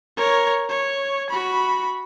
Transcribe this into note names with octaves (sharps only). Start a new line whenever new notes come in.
A#4 C#5
C#5
F#4 B5